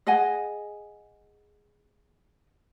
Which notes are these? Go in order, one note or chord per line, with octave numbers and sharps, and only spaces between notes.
G#4 D#5 F#5 G#5